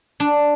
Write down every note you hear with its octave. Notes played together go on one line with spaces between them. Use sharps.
D4